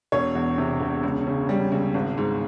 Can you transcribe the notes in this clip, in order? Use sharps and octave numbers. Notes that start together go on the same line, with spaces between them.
E1 C#5
E2
C3
E1
C#2
C#3
G3
C#2
G#1
G#2